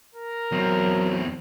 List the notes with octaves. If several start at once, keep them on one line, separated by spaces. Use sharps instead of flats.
A#4
E2 F#3 C4